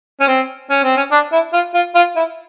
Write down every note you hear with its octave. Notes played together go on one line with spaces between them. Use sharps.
C#4
C4
C#4
C4
C#4
D4
E4
F4
F4
F4
E4